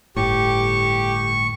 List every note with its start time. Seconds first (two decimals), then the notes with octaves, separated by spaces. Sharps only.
0.17 G1 A2 G4 C#6